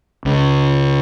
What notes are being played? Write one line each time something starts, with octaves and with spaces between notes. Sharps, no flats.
C#2